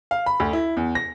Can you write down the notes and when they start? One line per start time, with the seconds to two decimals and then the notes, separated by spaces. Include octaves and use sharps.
0.11 F5
0.26 B5
0.40 D2
0.53 E4
0.77 E2
0.95 A#6